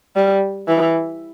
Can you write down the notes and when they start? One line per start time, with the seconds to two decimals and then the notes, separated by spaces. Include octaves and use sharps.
0.16 G3
0.68 E3